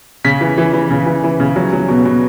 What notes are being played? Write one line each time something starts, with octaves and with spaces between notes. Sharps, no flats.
C#3 B6
E3
E3
E3
C#3
E3
E3
C#3
F#3
F#3
B2
B2